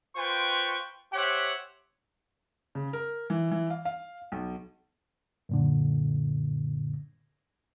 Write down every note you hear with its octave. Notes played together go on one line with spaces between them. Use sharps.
F4 B4 C5 G5 C#6
G4 C5 C#5 E5 F#5
C#3
A#4
E3
E3
F5
F5
B1
F#2 A#2 D3